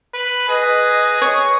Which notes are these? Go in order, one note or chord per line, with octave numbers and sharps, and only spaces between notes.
B4
G#4 B4 D#5
C#5